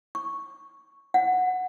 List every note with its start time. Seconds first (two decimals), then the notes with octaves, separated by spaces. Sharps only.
0.15 C#6
1.14 F#5